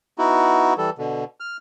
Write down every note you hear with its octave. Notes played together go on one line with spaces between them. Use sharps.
B3 D#4 E4 F#4
E3 G3 A4
B2 D3
F6